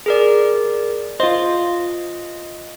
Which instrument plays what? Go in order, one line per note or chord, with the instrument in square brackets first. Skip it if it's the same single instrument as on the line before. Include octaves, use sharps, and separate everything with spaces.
[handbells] G#4 A#4 D5
[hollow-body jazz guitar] F4 C5 [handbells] D#5